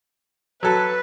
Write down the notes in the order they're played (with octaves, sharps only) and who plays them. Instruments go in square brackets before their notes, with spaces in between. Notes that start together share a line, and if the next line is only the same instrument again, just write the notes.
[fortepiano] F#3 A4 [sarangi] B4